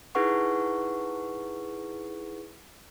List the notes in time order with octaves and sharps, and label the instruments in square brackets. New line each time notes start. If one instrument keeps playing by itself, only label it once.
[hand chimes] D#4 E4 G#4 B4 F#5 C#6